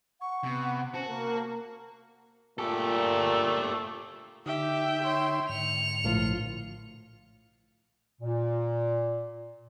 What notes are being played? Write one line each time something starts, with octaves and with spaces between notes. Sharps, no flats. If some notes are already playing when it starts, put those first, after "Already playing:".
F#5 C#6
C3 B3
C#4 F#4 C5 A5
A#3 A#4
A#2 A3 G4 A4
D3 D#4 G4 E5 G5
C#5 C6
G#2 D3 C#7 F7
A#1 A2 F3 F4
A#2